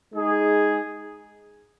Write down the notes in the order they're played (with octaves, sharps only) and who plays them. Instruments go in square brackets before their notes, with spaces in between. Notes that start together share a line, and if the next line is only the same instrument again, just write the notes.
[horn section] G#3 D#4 G#4